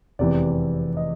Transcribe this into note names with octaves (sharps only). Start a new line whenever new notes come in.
F1 E2 C3 E3 D5
D#5